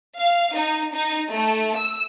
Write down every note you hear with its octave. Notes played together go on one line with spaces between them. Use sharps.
F5
D#4
D#4
A3
E6